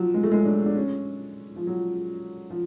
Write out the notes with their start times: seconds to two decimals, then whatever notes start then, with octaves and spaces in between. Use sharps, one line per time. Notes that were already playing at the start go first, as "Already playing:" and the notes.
Already playing: F3 F#3
0.14 G#3
0.23 A3
0.32 G#3
0.45 D4
0.66 D4
0.75 C#4
1.56 F3
1.67 F#3
2.50 F3